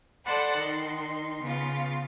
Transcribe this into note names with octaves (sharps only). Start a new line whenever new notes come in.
A4 C5 D5 F#5 A5 B5
D#3 D#4 C6
C#3 B3 F4